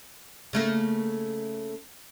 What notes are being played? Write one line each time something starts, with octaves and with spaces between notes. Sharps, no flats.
C#3 A3 A#3